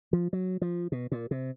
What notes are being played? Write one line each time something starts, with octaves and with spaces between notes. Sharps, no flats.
F3
F#3
F3
B2
A#2
C3